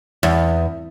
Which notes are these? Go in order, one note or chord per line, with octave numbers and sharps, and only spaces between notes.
E2